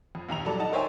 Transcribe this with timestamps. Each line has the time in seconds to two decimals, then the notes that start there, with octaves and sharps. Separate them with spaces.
0.15 F2
0.29 A#1 D#2 A#5 F7
0.45 F#3 G3 A4 D5
0.60 D#4 D#5 F#5 A5
0.73 A#4 C5 C#5 E5 G5 G#5